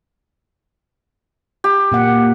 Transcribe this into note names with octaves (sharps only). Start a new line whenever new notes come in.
G4
A#2 A#3 F#5